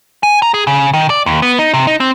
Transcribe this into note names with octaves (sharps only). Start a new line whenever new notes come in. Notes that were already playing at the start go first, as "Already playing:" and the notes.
G#5
A#5
G#4
C#3
D#3
D5
D#2
B3
D#4
C3
D#4
C4